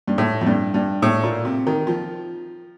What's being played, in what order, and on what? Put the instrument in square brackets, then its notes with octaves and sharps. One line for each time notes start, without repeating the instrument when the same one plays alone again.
[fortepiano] G2
A2
F2
G2
G2
A2
A#2
C3
D#3
F3